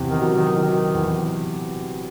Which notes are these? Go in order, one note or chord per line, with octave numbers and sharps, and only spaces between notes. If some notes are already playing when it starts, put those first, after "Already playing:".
Already playing: E2 C3
D#3
F#3
D#3
D#3 F#3
E2